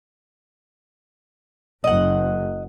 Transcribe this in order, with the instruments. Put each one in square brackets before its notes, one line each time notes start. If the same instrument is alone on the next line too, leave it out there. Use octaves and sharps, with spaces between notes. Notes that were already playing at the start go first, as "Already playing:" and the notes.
[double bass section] F#1 [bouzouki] D#5 F#5